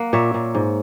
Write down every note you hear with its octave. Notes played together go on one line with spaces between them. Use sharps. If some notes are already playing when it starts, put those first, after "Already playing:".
Already playing: A#3 F#5
A#2 C#5 E5
A#2
G#2